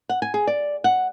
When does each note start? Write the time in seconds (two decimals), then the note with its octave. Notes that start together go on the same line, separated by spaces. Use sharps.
0.09 F#5
0.22 G#5
0.34 G#4
0.47 D5
0.84 F#5